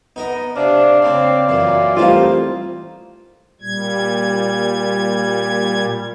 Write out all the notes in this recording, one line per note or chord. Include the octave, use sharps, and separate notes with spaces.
B3 D#4 A#4 D#5
C3 D4 D5 F5
C#3 A#3 C4
F#2 A#2 E3
E3 G3 A3 A#3 C4 D#4 F4
A#2 G3 G#6